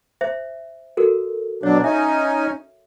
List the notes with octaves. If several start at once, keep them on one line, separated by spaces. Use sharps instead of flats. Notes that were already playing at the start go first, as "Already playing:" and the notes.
C5 E5
F#4 A4 A#4
B2 F#3 D4 C#5
C#4 D#4 E5 G#5